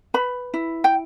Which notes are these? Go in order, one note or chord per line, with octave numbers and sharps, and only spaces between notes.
B4 B5
E4
G5